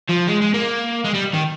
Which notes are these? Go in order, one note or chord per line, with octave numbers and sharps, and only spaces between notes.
F3
G#3
G#3
A#3
G#3
G3
D#3